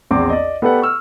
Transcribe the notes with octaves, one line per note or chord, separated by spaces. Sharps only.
A#1 E2 C4 D6
D5 D#5
B3 G4 A4 B4 D5 F#5
C#6 E6 F6